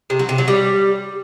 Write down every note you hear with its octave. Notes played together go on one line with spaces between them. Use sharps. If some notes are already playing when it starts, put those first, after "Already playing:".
C3
F#3
C3
F#3
G3